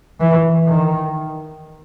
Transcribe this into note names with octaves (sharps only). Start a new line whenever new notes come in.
E3
D#3